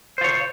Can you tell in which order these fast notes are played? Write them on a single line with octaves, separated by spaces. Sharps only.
C5 F4 C#5